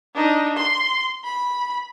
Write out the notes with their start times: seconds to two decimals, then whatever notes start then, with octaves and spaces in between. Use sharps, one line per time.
0.15 D4 D#4
0.57 C6
1.24 B5